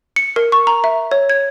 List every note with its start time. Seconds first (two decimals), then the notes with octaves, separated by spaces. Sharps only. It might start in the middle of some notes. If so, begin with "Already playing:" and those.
0.16 C#7
0.36 A#4
0.52 C#6
0.67 A#5
0.84 E5
1.11 C#5
1.30 G#6